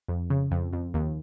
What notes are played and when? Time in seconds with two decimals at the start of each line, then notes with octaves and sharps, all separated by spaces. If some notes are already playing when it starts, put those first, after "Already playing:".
0.08 F2
0.30 C#3
0.51 F2
0.73 F2
0.94 D#2